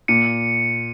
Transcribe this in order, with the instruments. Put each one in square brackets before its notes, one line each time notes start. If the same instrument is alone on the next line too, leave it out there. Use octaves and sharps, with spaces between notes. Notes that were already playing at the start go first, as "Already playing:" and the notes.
[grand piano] A#2 [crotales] C#7 D#7